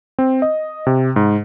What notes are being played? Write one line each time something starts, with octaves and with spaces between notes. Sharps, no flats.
C4
D#5
C3
G#2